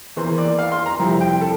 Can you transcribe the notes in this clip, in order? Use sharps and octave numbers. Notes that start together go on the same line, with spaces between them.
E2 E3 A#3 C5
D5
F5
C6
A#5
F2 C3 G3 C4 E4
G5
A4